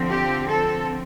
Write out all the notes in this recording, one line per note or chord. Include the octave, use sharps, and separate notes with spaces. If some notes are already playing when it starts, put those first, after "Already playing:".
Already playing: D3 F3 C4
G4
A4